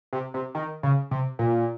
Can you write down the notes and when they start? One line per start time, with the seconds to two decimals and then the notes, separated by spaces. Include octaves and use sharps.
0.13 C3
0.34 C3
0.55 D#3
0.83 C#3
1.11 C3
1.39 A#2